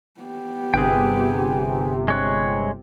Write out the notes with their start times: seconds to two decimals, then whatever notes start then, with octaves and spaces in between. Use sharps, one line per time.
0.21 B3 G4
0.74 G1 C3 G#4 B4 G5
2.08 G#3 C#5 F#6